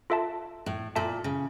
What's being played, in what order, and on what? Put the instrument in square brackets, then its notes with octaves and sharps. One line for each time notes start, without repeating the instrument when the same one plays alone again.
[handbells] F4 A4 E5 A5
[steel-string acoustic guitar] A2
[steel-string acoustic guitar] A#2 [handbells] F4 A4 E5 A5
[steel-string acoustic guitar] C#3